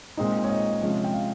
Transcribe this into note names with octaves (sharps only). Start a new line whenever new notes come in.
A#2 G#3 C4 D#4
C#5
D#5
C3 F3 G#3 C#4 F4
G5
F5